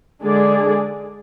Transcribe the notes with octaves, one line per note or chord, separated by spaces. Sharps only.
D3 G#3 D4 G#4 D5